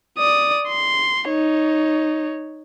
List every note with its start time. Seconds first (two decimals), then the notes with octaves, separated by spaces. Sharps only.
0.18 D5 D#6
0.68 C6
1.27 D#4 C#5